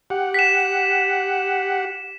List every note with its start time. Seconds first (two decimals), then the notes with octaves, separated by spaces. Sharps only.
0.10 G4 F#5
0.34 B6 E7